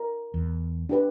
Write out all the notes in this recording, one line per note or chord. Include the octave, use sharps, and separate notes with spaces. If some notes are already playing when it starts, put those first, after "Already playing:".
Already playing: A#4
E2
D4 G4 B4